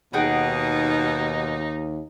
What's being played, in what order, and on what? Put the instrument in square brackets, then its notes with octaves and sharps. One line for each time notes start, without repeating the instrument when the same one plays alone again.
[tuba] D#2 [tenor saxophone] B2 [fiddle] D#4 [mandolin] G#4 F#5 G5